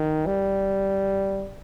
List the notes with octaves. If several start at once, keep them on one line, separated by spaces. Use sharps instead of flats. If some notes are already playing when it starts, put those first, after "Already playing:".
Already playing: D#3
G3